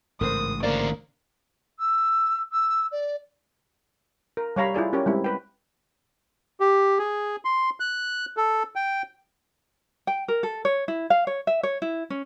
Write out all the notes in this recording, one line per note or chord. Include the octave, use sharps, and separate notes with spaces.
A1 G#2 C#3 A#4 C5 D#6
D3 A#3 C5 D5
E6
E6
D5
A#4
G3 C#5 F5 A#5 B5
E4 F4 G#4 D5
C#4 G4 A#4 C#5
G3 G#3 C4 E4
B4 G5
G4
G#4
C6
F#6
A4
G5
G5
A#4
A4
C#5
E4
F5
C#5
E5
C#5
E4
C#4